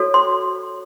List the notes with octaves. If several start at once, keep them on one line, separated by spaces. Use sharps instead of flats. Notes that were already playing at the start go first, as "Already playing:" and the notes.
Already playing: F#4 A4 C#5
C6